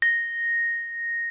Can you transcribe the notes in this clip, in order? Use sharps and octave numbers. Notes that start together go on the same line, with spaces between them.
A#6